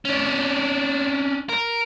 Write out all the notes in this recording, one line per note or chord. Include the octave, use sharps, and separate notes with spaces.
C#4 D4
A#4